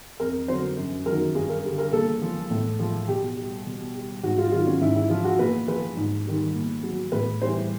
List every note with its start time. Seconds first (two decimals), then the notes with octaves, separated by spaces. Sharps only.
0.20 F2 A#4
0.48 D3 F#3 C5
0.77 F#2
1.06 D#3 F#3 A#4
1.35 G2 G#4
1.49 A#4
1.64 D3 G3
1.78 A#4
1.92 A#2 A4
2.22 F3
2.50 A2
2.79 F3
3.08 B2 G4
3.37 G3
3.66 B2
3.95 G3
4.23 G#2 F#4
4.38 F4
4.52 D#3 F#3 F4
4.67 C#4
4.81 G#2 E4
4.96 E4
5.10 F3 F4
5.24 F#4
5.39 A#2 B4
5.68 F3 B4
5.97 G#2
6.26 D#3 G3
6.54 A#2
6.83 F#3
7.12 A2 B4
7.41 E3 G3 C5